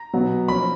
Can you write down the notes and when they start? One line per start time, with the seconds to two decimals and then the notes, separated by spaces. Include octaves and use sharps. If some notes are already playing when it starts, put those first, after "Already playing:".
Already playing: A#5
0.13 B2 F#3 B3
0.48 F3 A#3 C#4 B5